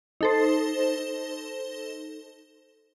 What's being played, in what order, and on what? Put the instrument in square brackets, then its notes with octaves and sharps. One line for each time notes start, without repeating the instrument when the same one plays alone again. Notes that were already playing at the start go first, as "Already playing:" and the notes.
[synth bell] D#4 A4 C5